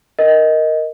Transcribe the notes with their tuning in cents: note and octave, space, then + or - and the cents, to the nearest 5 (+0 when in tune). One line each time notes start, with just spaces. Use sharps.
A#4 +0 D#5 +10